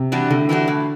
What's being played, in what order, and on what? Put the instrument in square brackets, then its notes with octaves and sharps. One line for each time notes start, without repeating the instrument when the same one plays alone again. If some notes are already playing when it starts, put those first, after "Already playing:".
Already playing: [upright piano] C3
[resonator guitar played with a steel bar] E3 G3 D4 F#4
[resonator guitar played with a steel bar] A2 [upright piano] D3
[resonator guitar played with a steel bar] E3 G3 D4 F#4
A2